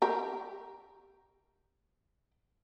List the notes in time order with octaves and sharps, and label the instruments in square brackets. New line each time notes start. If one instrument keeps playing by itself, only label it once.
[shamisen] G4 A#4